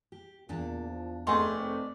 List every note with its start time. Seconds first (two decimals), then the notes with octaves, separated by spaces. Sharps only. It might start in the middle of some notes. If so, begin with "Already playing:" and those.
0.12 G4
0.49 E2 A#2 D4
0.88 F3
1.27 F1 A3 G#4 D5 D#5 G#5 C6
1.58 C4